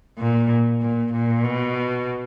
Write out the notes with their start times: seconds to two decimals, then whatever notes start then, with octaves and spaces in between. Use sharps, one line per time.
0.19 A#2
0.82 A#2
1.13 A#2
1.44 B2